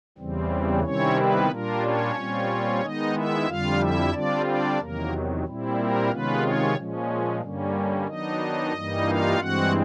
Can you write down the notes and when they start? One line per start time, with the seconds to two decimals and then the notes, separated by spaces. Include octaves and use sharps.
0.18 E2 C#3 E3 G3 C4
0.83 C3 D#3 G3 C4 C#4 E4 C#5
1.17 B3 B4
1.50 A#2 G3 A#3 D4 F4 A#4
1.82 C#4 C#5
2.15 A#2 G3 C4 F4
2.81 D#3 G#3 B3 D#4 D#5
3.14 E4 E5
3.47 F2 D3 G3 F4 F5
3.79 E4 E5
4.12 D3 G3 C4 D4 F4 D5
4.45 D4 D5
4.78 E2 C3 D#3 F#3 A#3 A#4
5.45 A#2 G3 C4 E4
5.77 A#3 A#4
6.09 C3 D#3 G#3 B3 C#4 F4 B4
6.43 C#4 C#5
6.76 A#2 F3 G#3 C#4
7.41 G2 D3 G3 A#3 C#4
8.07 D#3 F#3 B3 D4 D#4 D#5
8.73 G2 E3 G3 A#3 D#4
9.06 F4 F5
9.38 G2 E3 G#3 C4 F#4 F#5